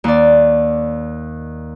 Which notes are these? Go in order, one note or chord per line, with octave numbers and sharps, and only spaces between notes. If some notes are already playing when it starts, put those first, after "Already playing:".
D#2 D5